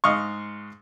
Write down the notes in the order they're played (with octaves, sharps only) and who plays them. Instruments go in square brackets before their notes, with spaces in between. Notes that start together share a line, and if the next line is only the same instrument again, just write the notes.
[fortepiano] G#2 D#5 F5 C#6